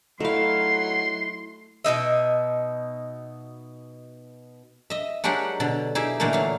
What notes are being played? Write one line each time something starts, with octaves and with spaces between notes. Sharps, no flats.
F#3 A3 D#4 E4 F5 C6
B2 A#3 D#4 E5
D#5 E5
F#3 G#3 D4 G4 A#4 F#5
B2 D3
D#4 E4 G4 G#4 E5
A#2 D3 E3 A3 A#3
F#3 F5